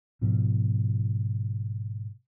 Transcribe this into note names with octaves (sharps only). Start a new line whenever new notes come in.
G#2 B2 F3